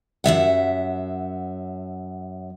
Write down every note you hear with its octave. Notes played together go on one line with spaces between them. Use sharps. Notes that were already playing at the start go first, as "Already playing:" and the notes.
F#2 G#3 E5 F#5